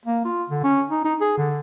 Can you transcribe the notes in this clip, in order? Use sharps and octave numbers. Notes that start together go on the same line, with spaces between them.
A#3
F4
D3
C#4
D#4
D#4
G#4
D3